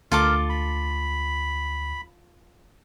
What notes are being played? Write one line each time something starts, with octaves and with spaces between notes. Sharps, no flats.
D2 F4 A4 A#4 D6
B5